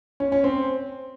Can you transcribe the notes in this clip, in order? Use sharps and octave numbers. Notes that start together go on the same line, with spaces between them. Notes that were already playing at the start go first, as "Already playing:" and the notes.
C#4
C#4
C4